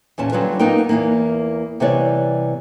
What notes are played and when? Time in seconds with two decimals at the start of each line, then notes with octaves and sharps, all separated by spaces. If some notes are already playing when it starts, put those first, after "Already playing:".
0.18 E2 A#2 C#4 A5
0.32 D3 F#3 G3 C#4 F4 B4
0.59 A#3 B3 D#4 A#4 G5
0.89 E2 E3 A#3
1.80 C3 E3 G3 B3 C#5 D5